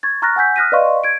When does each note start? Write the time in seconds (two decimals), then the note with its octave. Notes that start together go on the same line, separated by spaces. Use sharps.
0.03 C#6 G#6 A6
0.22 A#5 C#6 F6 F#6 A6 A#6
0.36 F#5 G#5 E6 G6 B6
0.56 D#6 F6 F#6 A#6 B6 D#7
0.72 B4 D5 D#5 F5 C6 C#6
1.04 G#6 D7